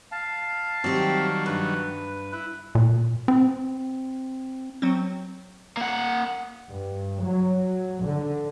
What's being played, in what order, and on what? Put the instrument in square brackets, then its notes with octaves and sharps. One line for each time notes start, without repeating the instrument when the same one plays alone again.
[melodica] F5 A5
[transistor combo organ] D#3 F#3 G3 [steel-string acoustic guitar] C4 G4
[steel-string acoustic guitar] G2 [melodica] B4
[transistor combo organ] E4
[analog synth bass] A#2
C4
[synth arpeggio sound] F#3 C4
[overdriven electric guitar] A#3 F#5
[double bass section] G2
F#3
D3